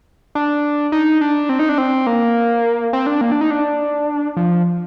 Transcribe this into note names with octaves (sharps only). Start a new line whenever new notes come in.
D4
D#4
D4
C4
D#4
D4
C4
A#3
C4
D4
A#3
D4
D#4
D4
F3